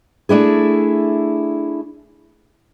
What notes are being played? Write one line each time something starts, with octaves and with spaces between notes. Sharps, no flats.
A3 D4 E4 G#4